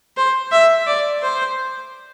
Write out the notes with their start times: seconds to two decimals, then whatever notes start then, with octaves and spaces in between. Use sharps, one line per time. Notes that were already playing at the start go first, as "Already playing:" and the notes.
0.17 C5
0.51 E5
0.87 D5
1.22 C5